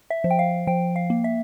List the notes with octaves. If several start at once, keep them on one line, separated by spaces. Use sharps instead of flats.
E5
F3
G5
F5
F3 G5
F5
A#3
E5